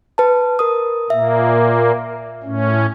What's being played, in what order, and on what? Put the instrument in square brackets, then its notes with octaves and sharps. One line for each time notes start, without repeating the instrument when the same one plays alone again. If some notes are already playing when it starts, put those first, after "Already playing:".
[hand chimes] B4 A5
A#4 D#6
[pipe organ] A#2 A#3 [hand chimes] E5
[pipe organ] A2 C#4